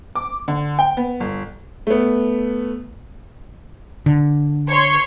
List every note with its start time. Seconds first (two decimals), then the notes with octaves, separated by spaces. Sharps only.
0.15 D6
0.48 D3
0.79 G5
0.97 B3
1.20 G1
1.87 A3 B3
4.06 D3
4.68 C#5 C6